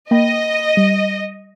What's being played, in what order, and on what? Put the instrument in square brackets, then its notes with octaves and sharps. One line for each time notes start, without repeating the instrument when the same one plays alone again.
[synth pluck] A#3 G5 B5 [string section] D#5
[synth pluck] G3 C#7 D#7